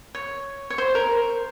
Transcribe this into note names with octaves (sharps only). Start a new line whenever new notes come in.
C#5
C#5
C5
A#4